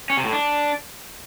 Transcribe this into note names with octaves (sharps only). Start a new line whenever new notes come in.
C#4
C3
A2
D4